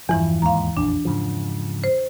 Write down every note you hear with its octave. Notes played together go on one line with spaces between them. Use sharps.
E2 G2 E3 F3
D#2 G#2 F5 A#5
A#1 F2 D4
G#2 C#3 F3
C5